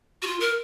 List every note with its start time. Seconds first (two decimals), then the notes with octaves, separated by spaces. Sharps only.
0.22 F#4
0.27 F4
0.40 A#4